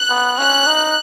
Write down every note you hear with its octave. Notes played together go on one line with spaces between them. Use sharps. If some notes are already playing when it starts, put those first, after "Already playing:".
Already playing: F#6
B3
C#4 F#6
D#4